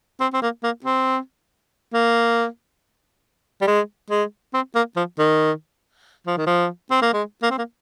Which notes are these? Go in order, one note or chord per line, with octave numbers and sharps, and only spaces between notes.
C4
C4
A#3
A#3
C4
A#3
G3
G#3
G#3
C4
A#3
F3
D#3
F3
D#3
F3
C4
A#3
G#3
A#3
C4
A#3